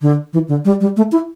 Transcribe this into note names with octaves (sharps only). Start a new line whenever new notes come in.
D3
E3
D3
G3
G3
A3
E4